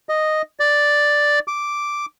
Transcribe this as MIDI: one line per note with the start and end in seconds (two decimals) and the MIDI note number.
0.09 0.42 75
0.60 1.39 74
1.48 2.06 86